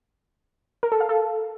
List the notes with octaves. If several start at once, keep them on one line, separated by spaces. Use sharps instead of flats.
A#4
A4
F5
A4